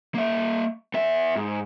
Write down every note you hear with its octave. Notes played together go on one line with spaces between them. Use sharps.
A#3 E5
B3 E5
G#2